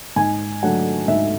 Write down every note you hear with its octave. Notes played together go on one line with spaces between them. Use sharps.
G#2 G#5
F#3 A3 D4 F#5
G#2 E5